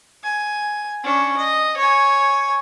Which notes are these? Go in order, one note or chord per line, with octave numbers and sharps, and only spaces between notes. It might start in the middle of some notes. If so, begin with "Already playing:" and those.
G#5
C#4 D4
D#5
C#5 G#5